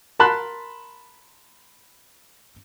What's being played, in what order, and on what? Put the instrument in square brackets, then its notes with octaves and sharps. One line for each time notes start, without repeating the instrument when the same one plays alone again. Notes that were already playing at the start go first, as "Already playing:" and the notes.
[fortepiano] A#4 A5 B5 C6 F#6